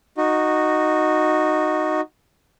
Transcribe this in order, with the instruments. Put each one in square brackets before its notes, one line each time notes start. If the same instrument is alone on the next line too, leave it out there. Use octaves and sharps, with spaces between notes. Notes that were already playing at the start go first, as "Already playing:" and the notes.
[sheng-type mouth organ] D#4 F#4